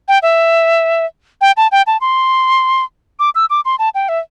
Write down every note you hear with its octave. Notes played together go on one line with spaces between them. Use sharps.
G5
E5
G5
A5
G5
A5
C6
D6
E6
D6
C6
A5
G5
E5